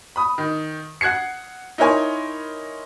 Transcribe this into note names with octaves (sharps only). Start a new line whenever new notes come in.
B5 D#6
D#3
F#5 F#6 G#6 C7 C#7
D#4 E4 A#4 C#5 G#5 C6